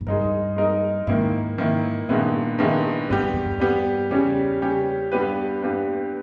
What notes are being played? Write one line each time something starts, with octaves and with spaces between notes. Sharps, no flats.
G#2
G2 G#3 D#4 A#4
G#3 D#4 A#4
G#2 D#3 A#3 E4
D#3 A#3 E4
G2 A#2 D#3 G#3 B3 E4
G2 D#3 G#3 B3 E4
G#2 G3 B3 G4
G2
E2
G2
G3 B3 G4
E2 C#3 G3 C#4 G4
C#3 G3 C#4 G4
G2 G3 B3 G4 B4
G2 G3 B3 G4 B4